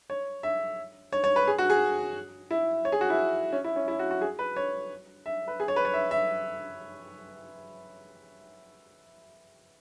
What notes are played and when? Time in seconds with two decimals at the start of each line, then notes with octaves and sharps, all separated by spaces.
0.10 C#5
0.43 E5
1.12 C#5
1.24 C#5
1.36 B4
1.47 G#4
1.58 F#4
1.70 G#4
2.51 E4
2.85 C#5
2.92 G#4
3.01 F#4
3.10 E4
3.53 C#4
3.64 E4
3.76 C#4
3.88 E4
3.99 F#4
4.11 F#4
4.21 G#4
4.39 B4
4.56 C#5
5.26 E5
5.48 B4
5.60 G#4
5.68 C#5
5.76 B4
5.85 C#5
5.94 E5
6.11 E5